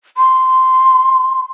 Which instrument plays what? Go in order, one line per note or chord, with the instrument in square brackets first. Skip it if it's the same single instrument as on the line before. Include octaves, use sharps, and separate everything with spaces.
[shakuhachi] C6